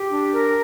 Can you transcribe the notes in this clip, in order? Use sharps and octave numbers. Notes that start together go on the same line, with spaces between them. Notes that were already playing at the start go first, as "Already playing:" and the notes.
Already playing: G4
D4
A#4